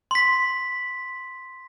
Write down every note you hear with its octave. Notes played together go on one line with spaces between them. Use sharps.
C6 B6